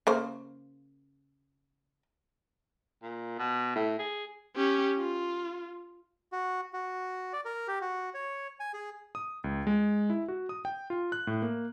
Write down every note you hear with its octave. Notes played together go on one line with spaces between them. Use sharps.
C#3 A#3 C5
A#2
B2
A2
G#4
C#4 G4
F4
F#4
F#4
D5
A#4
G4
F#4
C#5
G#5
G#4
D#6
C#2
G#3
E4
F#4
D#6
G5
F4
F#6
A2
A#3